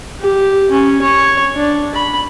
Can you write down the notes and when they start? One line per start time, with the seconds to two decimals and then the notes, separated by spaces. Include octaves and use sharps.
0.20 G4
0.71 C#4
1.02 C#5
1.56 D4
1.95 B5